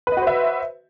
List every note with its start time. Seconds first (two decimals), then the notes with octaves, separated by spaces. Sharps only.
0.07 B4
0.12 D#5
0.17 F#4
0.22 C5
0.27 E5